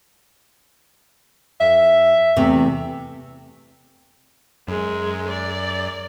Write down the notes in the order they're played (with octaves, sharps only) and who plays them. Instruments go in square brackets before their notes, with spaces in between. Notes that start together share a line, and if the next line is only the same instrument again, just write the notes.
[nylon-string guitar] F2 [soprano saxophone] E5
[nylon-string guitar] E2 C3 A3
[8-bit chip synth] F#2 [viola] G#3
[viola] D5